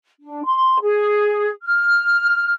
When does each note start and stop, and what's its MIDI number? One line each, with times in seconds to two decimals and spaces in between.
0.20 0.44 62
0.44 0.78 84
0.81 1.49 68
1.62 2.52 89